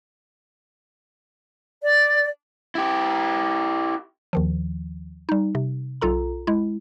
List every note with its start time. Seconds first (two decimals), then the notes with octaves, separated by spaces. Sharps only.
1.82 D5
2.75 E4 G4
4.33 D#2 D#3 F3
5.29 G3 D#4
5.55 C3
6.01 B1 F4 A4 A#5
6.47 G#3 E4